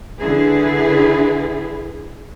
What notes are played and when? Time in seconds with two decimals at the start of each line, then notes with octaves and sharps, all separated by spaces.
0.18 D3 E4 G#4 B4